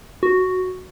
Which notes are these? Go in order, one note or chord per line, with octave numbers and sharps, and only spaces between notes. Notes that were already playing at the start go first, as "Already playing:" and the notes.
F#4